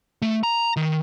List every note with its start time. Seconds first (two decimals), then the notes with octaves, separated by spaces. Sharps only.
0.22 A3
0.43 A#5
0.77 D#3